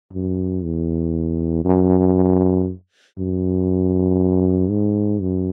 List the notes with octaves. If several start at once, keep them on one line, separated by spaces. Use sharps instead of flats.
F#2
E2
F#2
F#2
G#2
F#2